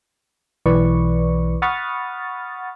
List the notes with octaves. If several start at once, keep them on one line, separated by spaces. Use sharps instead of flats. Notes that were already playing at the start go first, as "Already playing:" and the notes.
B1 E3 B4 D5 C#6
F#5 B5 C#6 D#6 F6 A6